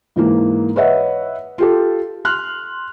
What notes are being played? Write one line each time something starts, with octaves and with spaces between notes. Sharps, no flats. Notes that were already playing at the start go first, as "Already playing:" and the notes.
G#2 E3 A#3
B4 C#5 D#5 E5 F#5
F4 G4 A4
C6 F6 F#6